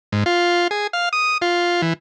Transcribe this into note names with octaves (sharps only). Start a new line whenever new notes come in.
G#2
F4
G#4
F5
D#6
F4
E3